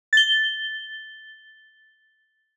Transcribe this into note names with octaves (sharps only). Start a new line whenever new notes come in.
A6 G7